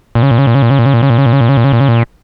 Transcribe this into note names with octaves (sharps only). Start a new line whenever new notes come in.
A#2
C#3
A#2
C#3
A#2
C#3
A#2
C#3
A#2
C#3
A#2
C#3
A#2
C#3
A#2
C#3
A#2
C#3
A#2
C#3
A#2
C#3
A#2